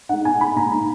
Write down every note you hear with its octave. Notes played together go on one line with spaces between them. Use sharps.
G#3 D#4 F#5
B2 G#5
G#3 D#4 B5
A#2 A#5
A#3 D#4 A#5